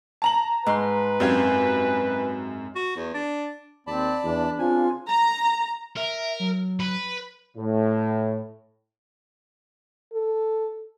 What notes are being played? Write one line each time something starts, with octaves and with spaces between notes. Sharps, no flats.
A5 A#5 F#7
G#2 B4 C6
F#2 C4 G4 F5 G#5 G#6
F#4
E2
D4
D#2 C4 D5 A5 B5
E2 D4
C#3 C4 F4 G#5
A#5
A#4 E5
F#3
B4
A2
A4